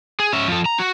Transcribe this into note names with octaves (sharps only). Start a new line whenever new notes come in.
G#4
C#4 E5
F3 A4
A#5
F#4